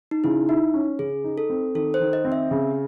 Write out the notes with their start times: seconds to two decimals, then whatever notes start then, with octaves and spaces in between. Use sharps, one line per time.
0.11 D#4
0.24 C#3 E4
0.49 D#4 E4
0.74 C#4
0.99 C#3 G#4
1.24 D#4
1.38 A4
1.50 C4
1.75 D#3 A4
1.94 C5
2.00 D#3
2.13 D#5
2.25 C4
2.32 E5
2.51 C#3